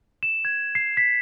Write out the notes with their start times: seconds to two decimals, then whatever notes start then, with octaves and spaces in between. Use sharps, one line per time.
0.23 E7
0.45 G#6
0.75 C7
0.97 B6